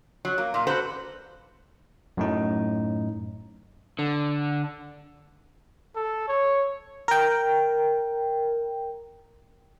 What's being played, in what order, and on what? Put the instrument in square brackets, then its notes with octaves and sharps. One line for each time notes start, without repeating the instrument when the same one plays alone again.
[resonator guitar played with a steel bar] F#3
A#3
A#2 F4
F#4 A4 B4 C5
[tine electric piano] F#2 A2 D#4
[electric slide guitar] D3
[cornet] A4
C#5
[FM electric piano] A#4 G5